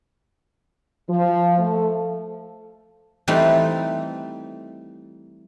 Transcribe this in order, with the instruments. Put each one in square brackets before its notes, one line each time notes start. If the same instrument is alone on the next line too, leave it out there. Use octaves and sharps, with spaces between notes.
[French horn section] F3
A3
[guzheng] E3 G3 A3 C4 D#4